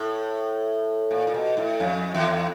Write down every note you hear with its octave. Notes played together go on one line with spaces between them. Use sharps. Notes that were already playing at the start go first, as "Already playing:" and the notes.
Already playing: A2
A#2
A#2
B2
A2
F2
E2